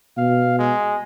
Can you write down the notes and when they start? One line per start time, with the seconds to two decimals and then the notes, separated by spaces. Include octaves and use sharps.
0.18 B2 F5
0.59 G#3